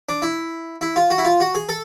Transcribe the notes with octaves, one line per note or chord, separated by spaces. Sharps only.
D4
E4
E4
F4
F#4
E4
F4
F#4
G#4
A4